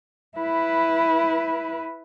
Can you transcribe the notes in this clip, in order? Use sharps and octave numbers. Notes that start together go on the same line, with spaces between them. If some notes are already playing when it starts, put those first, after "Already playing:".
E4 B4